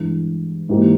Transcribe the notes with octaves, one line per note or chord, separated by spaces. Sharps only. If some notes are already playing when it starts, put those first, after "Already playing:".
Already playing: G2 E3 G#3 E4
G#2 E3 A#3 E4 G4